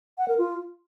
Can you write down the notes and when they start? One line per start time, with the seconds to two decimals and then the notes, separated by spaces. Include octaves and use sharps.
0.18 F#5
0.28 A#4
0.38 F4